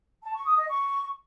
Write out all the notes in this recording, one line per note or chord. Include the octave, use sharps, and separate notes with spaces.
A5
C#6
D#6
D#5
C#6